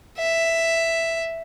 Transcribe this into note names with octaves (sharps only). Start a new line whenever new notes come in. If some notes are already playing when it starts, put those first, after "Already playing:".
E5